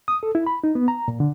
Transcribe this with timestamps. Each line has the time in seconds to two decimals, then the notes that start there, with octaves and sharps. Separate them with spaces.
0.08 D#6
0.23 A4
0.35 E4
0.47 B5
0.64 D#4
0.75 B3
0.88 A#5
1.08 A#2
1.20 D3